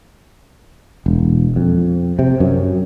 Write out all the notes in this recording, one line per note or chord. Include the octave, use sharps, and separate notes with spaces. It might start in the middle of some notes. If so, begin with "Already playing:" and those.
E1
F2
C3
F#2